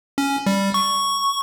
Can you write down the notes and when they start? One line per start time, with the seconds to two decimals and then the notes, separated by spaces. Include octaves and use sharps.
0.18 C#4
0.46 G3
0.74 C#6